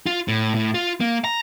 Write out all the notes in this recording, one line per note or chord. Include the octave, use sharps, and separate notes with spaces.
F4
A2
A2
F4
A#3
A#5